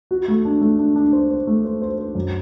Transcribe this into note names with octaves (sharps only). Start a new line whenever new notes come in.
F#4
A3
D4
A3
D4
D4
C5
C5
A3
C5
C5
C5
F#2